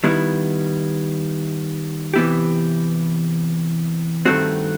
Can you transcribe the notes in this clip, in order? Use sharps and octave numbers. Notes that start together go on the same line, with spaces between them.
D#3 G3 B3 E4
C3 E3 B3 E4 G4
G2 D#3 A3 C4 F#4